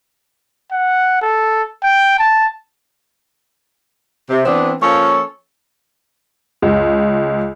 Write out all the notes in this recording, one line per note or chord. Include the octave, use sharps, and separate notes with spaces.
F#5
A4
G5
A5
C3
E3 B3 C4 D4
F3 A#3 C#4 A4 C#5
C#2